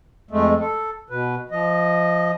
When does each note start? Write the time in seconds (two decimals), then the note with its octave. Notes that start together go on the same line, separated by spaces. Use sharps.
0.31 F2 G#3 A3
0.60 A4
1.10 B2 B4
1.51 F3 D#5